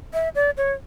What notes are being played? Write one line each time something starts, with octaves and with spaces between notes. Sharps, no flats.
E5
D5
C#5